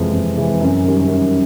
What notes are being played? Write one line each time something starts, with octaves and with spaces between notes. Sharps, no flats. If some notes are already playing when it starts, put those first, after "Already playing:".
Already playing: F2 C3 E3 G#3
F2
C3 E3 G#3
F#2
D#3 G3
F#2